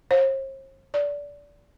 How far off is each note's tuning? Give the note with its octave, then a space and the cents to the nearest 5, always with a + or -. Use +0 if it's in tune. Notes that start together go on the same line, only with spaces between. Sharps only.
C5 +45
D5 -20